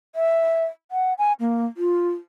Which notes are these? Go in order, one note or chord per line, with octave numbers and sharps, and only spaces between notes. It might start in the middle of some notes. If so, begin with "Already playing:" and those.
E5
F#5
G#5
A#3
F4